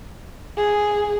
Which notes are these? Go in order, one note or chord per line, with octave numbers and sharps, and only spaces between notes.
G#4